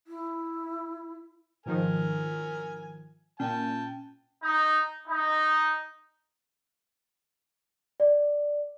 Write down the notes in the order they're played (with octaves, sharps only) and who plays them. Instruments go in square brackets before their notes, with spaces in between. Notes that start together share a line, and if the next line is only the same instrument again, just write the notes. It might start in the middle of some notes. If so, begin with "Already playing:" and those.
[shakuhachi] E4
[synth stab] G#2 D#3 F3 [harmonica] A#4 G#5
[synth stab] A#2 [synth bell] C#4 [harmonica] G5 A5
[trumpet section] D#4
D#4
[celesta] D5